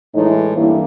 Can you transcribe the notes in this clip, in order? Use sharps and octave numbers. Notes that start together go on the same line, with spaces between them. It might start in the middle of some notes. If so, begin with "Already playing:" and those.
A2 E3 G#3 D#4
G2 E3 G3 A#3 E4